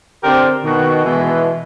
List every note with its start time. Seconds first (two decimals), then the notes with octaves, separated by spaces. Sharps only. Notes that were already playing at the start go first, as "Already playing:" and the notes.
0.24 D3 C4 G4 A#4 C5 D5
0.64 B2 D#3 F#4
1.05 B2 E3 G#3